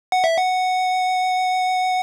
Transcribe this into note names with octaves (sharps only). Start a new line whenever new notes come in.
F#5
E5
F#5